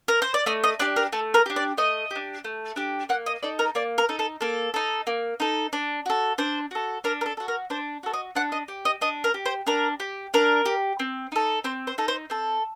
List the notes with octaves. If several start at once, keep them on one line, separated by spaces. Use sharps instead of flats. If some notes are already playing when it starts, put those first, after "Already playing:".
A#4
C5
D5
A3 D#5
D#5
D4 G4 D5
A#4
A3 A4
A#4
D4 G4
D5
A3 D#5
D4 G4
A3
D4 G4
A#3 F#5
D#5
D#4 A4 D5
A#4
A#3 D5
A#4
D#4 A4
A4
A#3 A4
D#4 A4
A#3
D#4 A4
D4
F#4 A4
D4 C5
F#4 A4
D4 A#4
A#4
A4
F#4 A4
A#4
D4 C5
F#4 A4
D#5
D4 F#5
D#5
G4
D#5
D4 D#5
A#4
G4
C5
D4 A#4
G4
D4 A#4
G4
C4
D#4 A4
C4 C5
C5
D#4 A4
C5
C4 A4